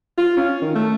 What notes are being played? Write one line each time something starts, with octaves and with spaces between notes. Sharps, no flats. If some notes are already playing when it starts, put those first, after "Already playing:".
F4
C#4
D#3
A3